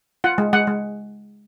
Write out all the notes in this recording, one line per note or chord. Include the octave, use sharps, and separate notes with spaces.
F4 F#5
G#3
G#3 F#5
G#3